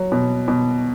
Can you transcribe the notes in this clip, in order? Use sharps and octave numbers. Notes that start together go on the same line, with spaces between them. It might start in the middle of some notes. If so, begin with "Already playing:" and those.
Already playing: F#3
B2
B2